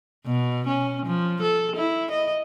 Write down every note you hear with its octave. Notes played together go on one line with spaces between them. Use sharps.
B2
C#4
F3
A4
E4
D#5